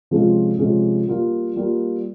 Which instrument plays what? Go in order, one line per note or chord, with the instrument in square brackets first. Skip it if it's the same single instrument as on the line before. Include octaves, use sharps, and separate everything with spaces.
[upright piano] C3 F3 G#3 C#4 F4
C3 F3 G#3 C#4 F4
G3 A#3 F4
G3 A#3 F4